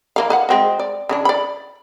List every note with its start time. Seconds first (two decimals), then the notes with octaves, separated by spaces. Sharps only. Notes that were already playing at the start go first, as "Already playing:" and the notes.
0.16 E3 A#3 F5
0.30 B4 F5 F#5
0.49 G#3 C4 F#4
0.80 D5
1.09 C#3 E3 D4
1.25 D5 B5